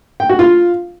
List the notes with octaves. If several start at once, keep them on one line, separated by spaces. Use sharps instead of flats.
G5
F#4
F4